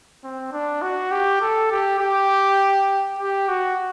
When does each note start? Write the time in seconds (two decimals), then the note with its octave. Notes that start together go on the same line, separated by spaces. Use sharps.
0.24 C4
0.52 D4
0.82 F#4
1.11 G4
1.42 A4
1.71 G4
2.00 G4
3.19 G4
3.48 F#4